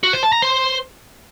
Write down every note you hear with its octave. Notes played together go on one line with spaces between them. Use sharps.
F#4
C5
A5
A#5
C5